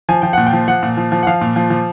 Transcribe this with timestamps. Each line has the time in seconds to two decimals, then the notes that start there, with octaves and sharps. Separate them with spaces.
0.09 F3 G#5
0.22 F3 G5
0.33 A#2 F#5
0.46 G5
0.53 F3
0.68 F3 F#5
0.83 A#2
0.97 F3
1.12 F3
1.23 F#5
1.27 F3 F5
1.41 A#2
1.56 F3
1.70 F3